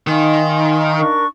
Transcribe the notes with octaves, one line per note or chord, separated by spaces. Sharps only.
D#3 D#4 D#5 F5 G#5 C6
D4 A#4 C#6